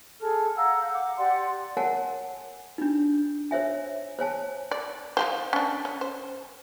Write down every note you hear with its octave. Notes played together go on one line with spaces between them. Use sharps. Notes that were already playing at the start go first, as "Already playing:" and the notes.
G#4 A4 F6
F5 F#5 A#5 E6
F5 G6
F#5 D6
G4 D5 F#5 C6
A#4 C#5 F#5 G#5 A5
D4 D#4
C5 C#5 E5 G#5
C5 C#5 G#5 A5
D5
F3 G4 C5
C#4 D4
C#4
C5